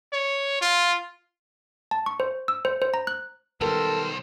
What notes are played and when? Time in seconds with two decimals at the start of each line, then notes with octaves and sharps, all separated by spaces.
0.13 C#5
0.61 F4
1.91 A5
2.06 C#6
2.20 C5
2.48 E6
2.65 C5
2.82 C5
2.94 A#5
3.07 F#6
3.61 B1 D#3 G3 B3 A4 A#4 C5